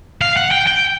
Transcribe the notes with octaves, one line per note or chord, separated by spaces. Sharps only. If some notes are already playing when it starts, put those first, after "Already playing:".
F5
F#5
G5
G5